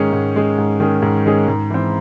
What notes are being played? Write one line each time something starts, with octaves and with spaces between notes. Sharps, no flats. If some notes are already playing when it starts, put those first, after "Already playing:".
Already playing: G#2 D#3 G#3 C#4 G#4
G#2
D#3 G#3 C#4 G#4
G#2
D#3 G#3 C#4 G#4
G#2
D#3 G#3 C#4 G#4
G#2
E3 C4